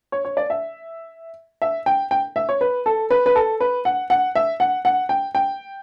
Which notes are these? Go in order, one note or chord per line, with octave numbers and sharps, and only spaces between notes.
C#5
C#5
D5
E5
E5
G5
G5
E5
C#5
B4
A4
B4
B4
A4
B4
F#5
F#5
E5
F#5
F#5
G5
G5